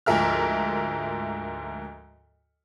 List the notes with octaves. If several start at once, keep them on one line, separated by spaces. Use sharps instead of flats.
D2 G#2 F3 A#4 E5 F6